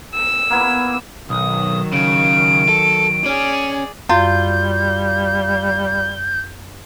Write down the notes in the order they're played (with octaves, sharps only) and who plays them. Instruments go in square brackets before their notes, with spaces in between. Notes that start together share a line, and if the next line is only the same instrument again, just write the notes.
[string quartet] E6
[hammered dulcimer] A#3 B3 E4
[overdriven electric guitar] B1 [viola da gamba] D#3 F#3 [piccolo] D#6
[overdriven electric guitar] C#3 [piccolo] D7
[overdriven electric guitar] A4
[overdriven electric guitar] C#4 [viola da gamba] G#4 D5
[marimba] F#2 [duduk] G3 [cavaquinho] F4 [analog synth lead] G6